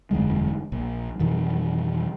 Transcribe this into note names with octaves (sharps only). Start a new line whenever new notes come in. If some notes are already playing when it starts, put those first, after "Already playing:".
E1 F#2 D3 G#3
A#1
F2 B2 D#3 E3